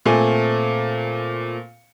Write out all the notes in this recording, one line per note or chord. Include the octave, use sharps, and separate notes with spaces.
A#2 A3 C4 G#5